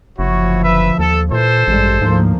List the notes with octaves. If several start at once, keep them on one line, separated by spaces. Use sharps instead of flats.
F#1 D2 F3 E4 F#4 C#5
B4 E5
D#2 A4
A#2 E3 A4 C5
A1 G2 G3 G#3
D2 G#2 F3 A#3